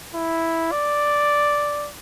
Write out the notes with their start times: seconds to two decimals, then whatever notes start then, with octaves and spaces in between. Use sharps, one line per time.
0.15 E4
0.72 D5